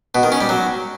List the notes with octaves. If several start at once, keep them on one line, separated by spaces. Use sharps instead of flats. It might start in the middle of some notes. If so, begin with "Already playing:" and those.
B2
D#3
C#4
G3
F#3